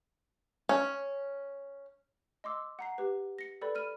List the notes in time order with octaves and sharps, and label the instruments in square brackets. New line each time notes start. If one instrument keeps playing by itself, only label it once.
[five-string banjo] C#4
[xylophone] D#5 C6 D6 E6
F#5 A#5 C7
G4 B4
A#6 C#7
A4 B4 D5 B5
B5 F6 D#7